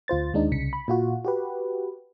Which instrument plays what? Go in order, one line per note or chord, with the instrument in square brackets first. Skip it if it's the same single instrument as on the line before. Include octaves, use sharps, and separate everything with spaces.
[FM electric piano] D2 F4 C5 A6
D#2 G#3 D4 D#4
C2 C#3 B6 C#7
B5
A#2 F4 F#4
F#4 G4 B4